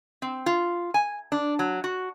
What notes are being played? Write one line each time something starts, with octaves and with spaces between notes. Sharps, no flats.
C4
F4
G#5
D4
F#3
F#4